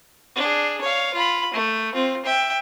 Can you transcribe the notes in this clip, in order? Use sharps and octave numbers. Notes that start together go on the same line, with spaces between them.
D4 G#4
C#5 F5
F4 B5
A3
C4 F4
E5 G5